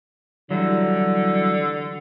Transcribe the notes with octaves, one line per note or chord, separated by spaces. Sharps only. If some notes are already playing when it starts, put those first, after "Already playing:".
D3 E3 F#3 G3